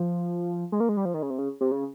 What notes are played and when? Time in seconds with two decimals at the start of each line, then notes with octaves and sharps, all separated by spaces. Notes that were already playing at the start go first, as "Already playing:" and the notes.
Already playing: F3
0.72 G#3
0.80 A#3
0.89 G#3
0.97 G3
1.05 F3
1.14 D#3
1.23 C#3
1.30 C3
1.39 C#3
1.61 C3
1.71 C#3